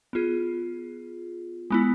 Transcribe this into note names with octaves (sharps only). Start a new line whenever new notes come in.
B3 F4 G#4
G#3 B3 E4